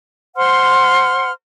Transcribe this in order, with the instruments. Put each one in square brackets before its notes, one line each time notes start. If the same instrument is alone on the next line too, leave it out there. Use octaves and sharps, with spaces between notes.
[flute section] C5 F#5 C6 F6